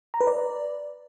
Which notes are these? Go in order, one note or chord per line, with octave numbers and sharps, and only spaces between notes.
A#5
B4
D5